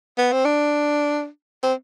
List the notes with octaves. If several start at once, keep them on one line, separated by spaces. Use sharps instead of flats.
B3
C4
D4
C4